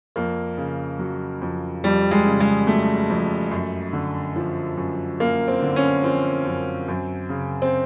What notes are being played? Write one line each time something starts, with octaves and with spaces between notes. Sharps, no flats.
F2 A#3
C#3
F#3
F2
F2 G3
G#3
C#3
G#3
F#3 A3
F2
F#2
D3
F3
F#2
F#2 A#3
C4
D3
C#4
F3 C4
F#2
F#2
C#3
C4